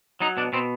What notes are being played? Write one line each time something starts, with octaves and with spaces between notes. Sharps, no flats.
F#3 D#4
B2 D4
B2 C4